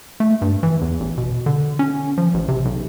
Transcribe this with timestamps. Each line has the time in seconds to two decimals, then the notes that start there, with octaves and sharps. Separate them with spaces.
0.20 A3
0.42 G2
0.63 E3
0.81 E2
1.00 A1
1.18 B2
1.46 D3
1.79 C#4
2.18 F3
2.34 A1
2.48 C3
2.65 B1